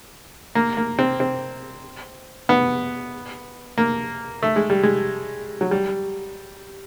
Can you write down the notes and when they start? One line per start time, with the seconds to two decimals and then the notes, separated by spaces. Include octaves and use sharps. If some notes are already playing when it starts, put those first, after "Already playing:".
0.55 A#3
0.77 A#3
0.99 C4
1.20 C4
2.49 B3
3.78 A#3
4.43 A3
4.56 G#3
4.70 G3
4.83 G#3
5.61 F#3
5.71 G3